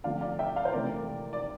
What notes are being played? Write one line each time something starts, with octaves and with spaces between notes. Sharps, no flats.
D3 F3 A3 C4 D5 F5
D5 F5
E5 G5
D5 F5
C5
C3 E3 A3 C4 A#4 D5
D5